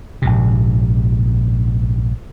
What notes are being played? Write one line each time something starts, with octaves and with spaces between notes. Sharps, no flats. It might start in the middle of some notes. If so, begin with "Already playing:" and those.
A#1 G#2 C3